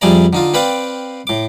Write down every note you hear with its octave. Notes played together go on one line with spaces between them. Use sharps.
F2 G3 A3 G#4 D5 A#5
D3 D#4 F4
C4 B4 D5 F5 G5
A2 D6